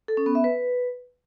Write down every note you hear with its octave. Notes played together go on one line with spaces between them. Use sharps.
A4
C#4
B3
E5
B4